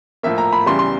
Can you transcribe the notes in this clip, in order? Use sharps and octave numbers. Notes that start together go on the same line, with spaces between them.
A2 F3 A#3 E5
A#5
B5
E2 C#3 E3 G3 C6
C6